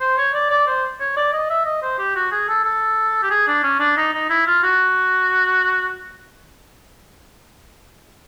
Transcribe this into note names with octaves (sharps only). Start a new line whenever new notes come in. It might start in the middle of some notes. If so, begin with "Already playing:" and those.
C5
C#5
D5
D5
C5
C#5
D5
D#5
E5
D#5
C5
G4
F#4
G#4
A4
A4
G4
G#4
D4
C#4
D4
D#4
D#4
E4
F4
F#4